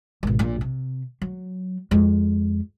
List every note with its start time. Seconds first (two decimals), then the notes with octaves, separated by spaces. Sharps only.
0.23 G#1 B2
0.39 A#1 A#2
0.61 C3
1.22 F#3
1.91 F2 G#3